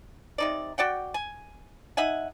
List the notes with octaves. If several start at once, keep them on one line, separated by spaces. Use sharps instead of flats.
C3 D#4 D5
F#4 D5 F#5 G5
G#5
D#4 E5 F#5 G#5